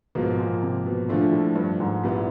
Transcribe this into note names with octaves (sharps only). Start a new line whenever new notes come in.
G#2 B2 F3 A#3
A#2
C3
B2
A#2 D3 F3 A3 D4
A2
G2
G#2
A#2 G3 B3 E4